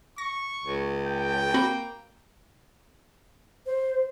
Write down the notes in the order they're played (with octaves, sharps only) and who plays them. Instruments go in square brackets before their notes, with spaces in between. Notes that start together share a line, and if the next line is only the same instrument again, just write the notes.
[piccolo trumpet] C#6 [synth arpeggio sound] A#6
[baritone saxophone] C#2
[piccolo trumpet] G5
[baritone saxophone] A#3 [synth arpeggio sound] C4 F#4 B5
[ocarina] C5